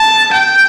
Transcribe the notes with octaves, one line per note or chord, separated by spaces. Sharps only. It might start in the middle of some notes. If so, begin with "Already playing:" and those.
Already playing: A5
G5